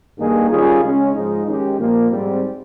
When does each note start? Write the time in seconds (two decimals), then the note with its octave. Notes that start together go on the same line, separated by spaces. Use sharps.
0.17 G2 D#3 A#3 D#4 G#4
0.49 D#3 G3 C#4 F4 G#4
0.81 C#3 G#3 C#4
1.13 G#2 F3 G#3 D#4
1.45 D#3 G#3 C#4 G4
1.77 A#2 F3 A#3
2.10 G#2 G3 C4